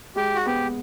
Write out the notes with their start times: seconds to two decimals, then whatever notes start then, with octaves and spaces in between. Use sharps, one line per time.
0.16 G#3 G4
0.35 F#4
0.46 B3 G4